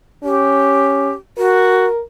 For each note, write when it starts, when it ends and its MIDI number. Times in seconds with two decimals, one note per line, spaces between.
0.24 1.12 61
0.24 1.14 67
1.38 1.86 66
1.38 2.01 70